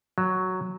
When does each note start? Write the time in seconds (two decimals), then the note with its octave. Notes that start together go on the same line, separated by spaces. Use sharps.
0.18 F#3